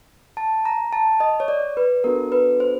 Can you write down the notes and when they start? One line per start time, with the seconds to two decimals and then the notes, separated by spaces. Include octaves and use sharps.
0.37 A5
0.65 A#5
0.93 A5
1.20 D#5
1.40 C#5
1.48 D5
1.77 B4
2.04 B3 D4 F#4 A4 A#4
2.32 B4
2.60 C5